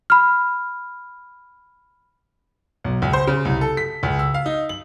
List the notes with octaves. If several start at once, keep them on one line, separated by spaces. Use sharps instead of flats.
B5 F6
B1
C#2
C5
C#3
C2
A4
B6
C#2
E6
F5
D#4
F#7